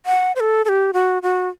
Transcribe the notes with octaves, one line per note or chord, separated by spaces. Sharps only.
F#5
C5
A4
A4
G4
F#4
F#4